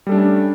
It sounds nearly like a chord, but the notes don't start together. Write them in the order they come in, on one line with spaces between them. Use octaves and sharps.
G3 A4 D4 A3 C#4